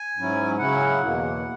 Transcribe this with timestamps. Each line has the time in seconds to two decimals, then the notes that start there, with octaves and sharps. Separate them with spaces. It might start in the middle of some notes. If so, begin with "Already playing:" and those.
Already playing: G#5
0.16 G#2 F#3 C#4 E4
0.59 C#3 F#3 C#4 E4 F#5
1.01 E2 B2 A#3